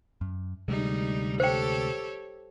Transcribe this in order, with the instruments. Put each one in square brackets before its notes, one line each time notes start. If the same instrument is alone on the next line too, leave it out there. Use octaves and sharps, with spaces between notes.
[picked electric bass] F#2
[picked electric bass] D2 C3 G#3 [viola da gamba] G3 D#4
[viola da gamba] G4 A4 C#5 [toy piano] C5 G5